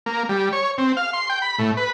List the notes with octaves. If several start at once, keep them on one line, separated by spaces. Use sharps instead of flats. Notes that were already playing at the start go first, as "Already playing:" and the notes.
A#3
G3
C#5
C4
F5
C6
G5
B5
A2
B4